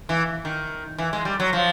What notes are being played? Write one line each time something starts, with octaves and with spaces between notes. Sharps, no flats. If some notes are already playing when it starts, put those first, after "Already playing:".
E3
D#3
E3
G#3
G3
F#3
F3